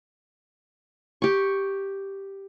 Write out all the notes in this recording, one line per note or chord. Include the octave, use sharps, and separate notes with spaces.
G4 C#6